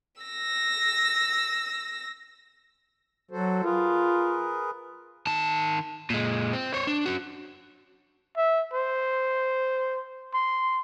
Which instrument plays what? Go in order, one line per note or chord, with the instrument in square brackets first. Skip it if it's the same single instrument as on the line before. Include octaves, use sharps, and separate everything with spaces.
[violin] E6 A#6
[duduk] F#3 [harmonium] F#4 A4 C5
[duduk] F4 [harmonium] G#4 A#4 B4
[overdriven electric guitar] D#3 A5
A#2 G#3
C4
C5 C#5
D4
C#4 F#4
[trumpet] E5
C5
C6